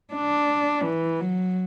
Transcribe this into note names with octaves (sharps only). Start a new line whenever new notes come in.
D4
E3
F#3